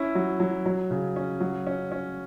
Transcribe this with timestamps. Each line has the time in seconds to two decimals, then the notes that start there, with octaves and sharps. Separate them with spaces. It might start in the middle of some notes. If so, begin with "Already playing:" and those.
Already playing: C#4 E4
0.15 F#3
0.40 F#3
0.66 F#3
0.91 C#3
1.16 C#4
1.40 F#3
1.67 C#4
1.92 C#4